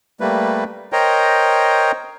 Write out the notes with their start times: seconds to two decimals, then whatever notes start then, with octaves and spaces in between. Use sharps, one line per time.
0.20 G3 A3 A#3 B4
0.92 A#4 C5 C#5 D#5 G5 A#5